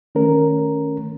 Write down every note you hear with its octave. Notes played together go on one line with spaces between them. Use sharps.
D#3 A3 C#4 A#4